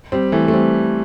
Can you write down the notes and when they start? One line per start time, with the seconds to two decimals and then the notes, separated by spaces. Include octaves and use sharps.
0.12 G3 C4
0.32 E3 A3
0.48 A3
0.54 G3 C4